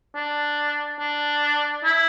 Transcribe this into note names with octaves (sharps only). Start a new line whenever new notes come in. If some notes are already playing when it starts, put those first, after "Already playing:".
D4
D4
E4